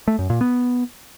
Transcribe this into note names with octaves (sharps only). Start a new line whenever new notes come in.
A3
F#2
A#2
B3